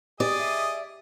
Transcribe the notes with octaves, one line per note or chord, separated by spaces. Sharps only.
G4 G#4 D5 D#5
E5